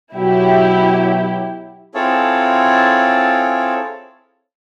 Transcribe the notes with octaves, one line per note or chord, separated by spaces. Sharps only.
B2 F#3 E4 G4
C4 E4 F4 G#4 A4 C#5